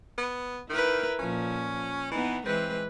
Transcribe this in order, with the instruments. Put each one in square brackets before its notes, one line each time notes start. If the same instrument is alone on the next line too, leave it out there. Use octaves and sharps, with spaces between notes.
[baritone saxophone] B3
[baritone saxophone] D#3 [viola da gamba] E4 A#4 B4
[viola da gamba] A#2 F3 [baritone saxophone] C#4
[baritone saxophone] E3 [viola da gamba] B3 D#4
[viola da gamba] E3 G#3 B4 [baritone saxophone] C4